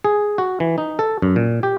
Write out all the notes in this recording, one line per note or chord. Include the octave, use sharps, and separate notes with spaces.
G#4
F#4
E3
D#4
A4
F#2
A#2
G4